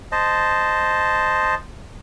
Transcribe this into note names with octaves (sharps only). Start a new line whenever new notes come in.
C5 D#5 A5